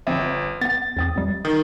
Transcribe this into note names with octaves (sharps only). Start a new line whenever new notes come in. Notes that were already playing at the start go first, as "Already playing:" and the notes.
G1 F3 C4 E5
B3 F#5 A6
E2 C4 D#6
F2 G3
D#3 D#6